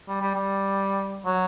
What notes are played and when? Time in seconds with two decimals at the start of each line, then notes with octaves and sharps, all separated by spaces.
0.08 G3
0.21 G3
0.35 G3
1.25 F#3